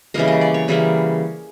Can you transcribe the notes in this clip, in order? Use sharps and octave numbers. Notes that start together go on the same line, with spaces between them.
C#3 E3 G3 A#3 D#5
D#5
D5
C#5
C#3 E3 G3 A#3 G#4